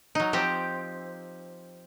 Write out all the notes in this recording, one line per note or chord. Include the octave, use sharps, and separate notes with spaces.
F#3 D#4
F3 C4 G4